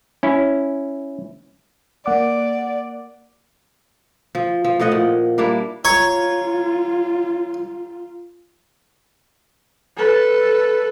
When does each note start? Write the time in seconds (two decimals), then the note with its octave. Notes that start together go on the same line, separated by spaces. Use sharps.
0.23 C#4 E4
2.06 A#3 D5 F#5 D6
4.35 F3
4.64 F3
4.80 A2 F3 D#5 F#5
4.92 A#2
5.38 G3 A#3 D4 E4
5.85 F4 C#5 A#5
9.97 A4 B4